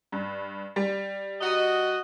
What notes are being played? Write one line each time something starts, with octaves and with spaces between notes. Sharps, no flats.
G2
G3
F#4 D#5